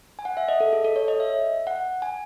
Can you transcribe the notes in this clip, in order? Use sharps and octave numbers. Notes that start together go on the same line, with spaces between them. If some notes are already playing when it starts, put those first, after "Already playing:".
G#5
F#5
E5
D#5
A4
G#4
A4
C#5
D#5
E5
F#5
G#5